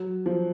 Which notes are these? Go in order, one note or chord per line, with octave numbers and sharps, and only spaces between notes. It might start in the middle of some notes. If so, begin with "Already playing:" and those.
Already playing: F#3
F3